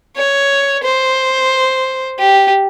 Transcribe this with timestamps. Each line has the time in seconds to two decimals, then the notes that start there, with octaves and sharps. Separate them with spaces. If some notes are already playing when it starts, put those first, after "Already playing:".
0.16 C#5
0.83 C5
2.19 G4